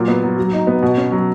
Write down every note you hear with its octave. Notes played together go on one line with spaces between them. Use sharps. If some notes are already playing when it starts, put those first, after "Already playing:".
Already playing: A#2 F#3
B3
F#3
F#3
D#4
B3
B2
C#4
F#3